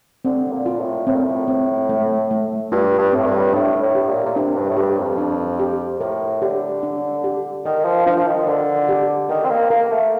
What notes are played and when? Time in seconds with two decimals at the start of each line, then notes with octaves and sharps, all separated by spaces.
0.25 D3 C4
0.52 A#2
0.66 F4
0.80 A2
1.07 A2 C4
1.15 A#2
1.24 A2
1.48 C4
1.89 A3
2.31 A3
2.72 G2 F4
2.98 G2
3.12 A2 C4
3.26 G2
3.54 A2 D4
3.82 A2
3.95 G4
4.09 A#2
4.26 A#2
4.36 C3 D4
4.57 G2
4.70 A2
4.77 G2 G4
4.98 F2
5.18 D4
5.59 G4
6.01 A2 A#4
6.41 D3 G4
6.83 D4
7.24 G4
7.65 D#3 A#4
7.85 F3
8.06 F3 D4
8.17 F3
8.27 D#3
8.47 D3 A#4
8.89 G4
9.29 D#3 A#4
9.45 C4
9.50 A#3
9.70 A#3 A#4
9.91 A3